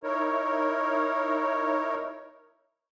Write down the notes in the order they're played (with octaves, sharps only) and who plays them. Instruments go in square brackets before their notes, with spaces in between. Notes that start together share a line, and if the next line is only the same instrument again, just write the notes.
[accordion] D#4 E4 A#4 C#5